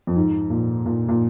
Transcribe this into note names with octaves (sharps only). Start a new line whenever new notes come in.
F2
G#2
A#2
A#2
A#2